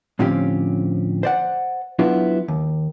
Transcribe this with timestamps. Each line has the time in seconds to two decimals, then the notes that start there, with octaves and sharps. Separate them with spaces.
0.19 A2 D3 F3 C4 C#4 G4
1.23 C5 D5 F#5
1.99 F#3 B3 D4 E4 F4 G4
2.48 D#2